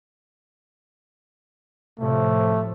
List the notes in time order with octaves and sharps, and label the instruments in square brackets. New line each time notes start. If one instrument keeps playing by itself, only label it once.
[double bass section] A2 C3 F3 [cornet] A3